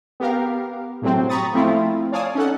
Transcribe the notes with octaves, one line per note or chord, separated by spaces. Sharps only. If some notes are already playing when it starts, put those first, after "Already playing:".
B3 G4 A#4 F5
A2 C3 F#3 C4
A#5 B5 C#6 D#6 A6
F3 A3 C4 E4 F4
C#5 D5 F5 G#5 A5 D#6
C#4 D#4 A4 F#5